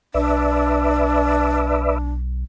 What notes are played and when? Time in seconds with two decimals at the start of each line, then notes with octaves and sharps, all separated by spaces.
0.14 B1 D4 B4 D5 E5